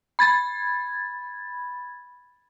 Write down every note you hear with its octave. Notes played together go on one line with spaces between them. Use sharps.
B5 G#6 A6